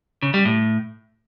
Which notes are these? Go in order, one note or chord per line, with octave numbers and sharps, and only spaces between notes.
C#3
G3
A2